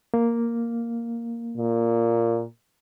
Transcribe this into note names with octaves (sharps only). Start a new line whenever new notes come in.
A#3
A#2